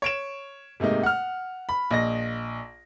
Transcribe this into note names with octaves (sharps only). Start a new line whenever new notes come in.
C#5 D7 E7
G#2 C3 A3 A#3 D#4
F#5 F6
B5
A#1 D#5 A#6